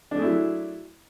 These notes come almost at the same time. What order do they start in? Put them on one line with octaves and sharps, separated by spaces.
D4 A3 G#4 E4 F#3